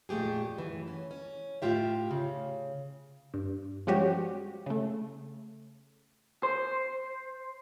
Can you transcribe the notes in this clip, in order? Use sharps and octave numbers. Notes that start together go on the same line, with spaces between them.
F2 A#2 A3 G4 G#4
F#2 E3
C#4
C#4
A2 F4 G4 E5
C#3
G2
F3 G3 G#3 C#4 F#4 G4
C#3 A3
C5